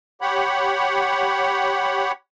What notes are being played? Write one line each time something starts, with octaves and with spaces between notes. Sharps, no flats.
G4 C#5 F#5 B5